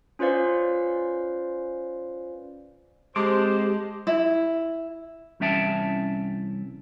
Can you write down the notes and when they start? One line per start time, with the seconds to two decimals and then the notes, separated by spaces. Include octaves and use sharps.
0.19 C#4 F4 B4 C5 D5 F5
3.16 G#3 C4 G4 C5 A5 C6 D6
4.07 E4
5.40 C2 E3 C#4 E5 G5 A5